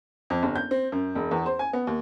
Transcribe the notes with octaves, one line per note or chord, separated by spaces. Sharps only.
F2
G1
G6
C4
F#2
E1
E2
C5
G#5
B3
D#2